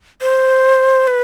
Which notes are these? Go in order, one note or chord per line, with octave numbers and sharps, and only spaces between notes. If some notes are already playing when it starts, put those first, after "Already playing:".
C5
B4